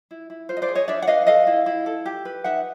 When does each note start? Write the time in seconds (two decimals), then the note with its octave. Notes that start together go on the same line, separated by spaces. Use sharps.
0.11 E4
0.30 E4
0.49 F4 C5
0.57 D#5
0.62 C5 D5
0.68 G#4
0.75 C#5 D#5
0.88 D4 D5 E5
1.02 F#5
1.08 B4 D#5 F5
1.27 A4 D#5 F5
1.47 E4
1.66 E4
1.86 A4
2.06 G4
2.25 B4
2.44 D#4 E5 F#5